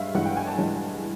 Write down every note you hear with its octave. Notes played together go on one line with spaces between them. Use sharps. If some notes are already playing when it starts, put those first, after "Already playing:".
Already playing: G2 G#3 E5 F5
G2 E3 G#3 F#5
G5
G#5
A5
G2 E3 G#3